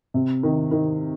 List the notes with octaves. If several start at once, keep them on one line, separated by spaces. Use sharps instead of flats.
C3
D#3
D#3